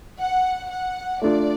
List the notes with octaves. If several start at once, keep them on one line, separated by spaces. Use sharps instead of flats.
F#5
F#5
A3 D4 F4 D5